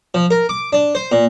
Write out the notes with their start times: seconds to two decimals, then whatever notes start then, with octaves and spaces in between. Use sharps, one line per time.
0.14 F3
0.31 A#4
0.49 D6
0.73 D4
0.95 C5
1.12 A#2